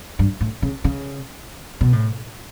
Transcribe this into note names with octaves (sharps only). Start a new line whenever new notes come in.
G2
A2
C#3
C#3
B2
A2